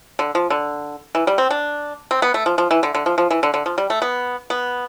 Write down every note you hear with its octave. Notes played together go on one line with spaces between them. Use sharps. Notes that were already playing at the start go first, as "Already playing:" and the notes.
D3
F3
D3
E3
G3
C4
D4
C4
B3
A3
F3
F3
E3
D3
D3
F3
F3
E3
D3
D3
F3
G3
A3
B3
B3